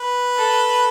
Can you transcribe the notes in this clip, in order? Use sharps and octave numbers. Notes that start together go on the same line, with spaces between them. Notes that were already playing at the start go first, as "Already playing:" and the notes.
Already playing: B4
A4